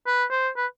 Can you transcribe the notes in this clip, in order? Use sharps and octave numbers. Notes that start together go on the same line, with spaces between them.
B4
C5
B4